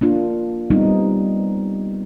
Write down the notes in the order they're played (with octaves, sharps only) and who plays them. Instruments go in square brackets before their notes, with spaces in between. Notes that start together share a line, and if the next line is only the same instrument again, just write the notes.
[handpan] A#3 D4 F4
G3 B3 C4 D#4